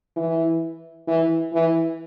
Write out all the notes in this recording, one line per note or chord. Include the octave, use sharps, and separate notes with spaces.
E3
E3
E3